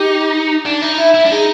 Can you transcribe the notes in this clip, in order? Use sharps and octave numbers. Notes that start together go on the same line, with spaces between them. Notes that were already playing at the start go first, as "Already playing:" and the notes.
Already playing: D#4 G4
D4
D#4
E4
E4
D4
D#4 G#4